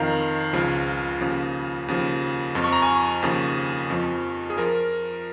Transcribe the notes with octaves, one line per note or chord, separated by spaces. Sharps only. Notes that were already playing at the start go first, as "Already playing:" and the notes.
Already playing: F2 D#3 F5 A#5
C#2 C#3 F3
D#2 C#3 F3
D#2 C#3 F3
F2 F3
C#6
A#5
G#5 C#6
D#2 C#3 F3
F2 F3
G#4
F3 F4 A#4